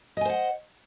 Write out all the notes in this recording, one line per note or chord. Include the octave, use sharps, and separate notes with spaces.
C5 D#5 F#5 G#5